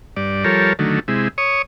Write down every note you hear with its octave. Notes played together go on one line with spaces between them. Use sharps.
G2 D5
F3 G3 A4 A#4 C#5
D3 D#3 F#3 A3
C3 G#3 E4
C#5 C#6 D#6